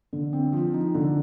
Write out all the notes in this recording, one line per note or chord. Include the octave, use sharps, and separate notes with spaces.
D3
C4
F3
D#4
D3